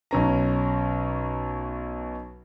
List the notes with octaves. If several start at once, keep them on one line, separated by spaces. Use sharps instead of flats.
B1 C#4 A#5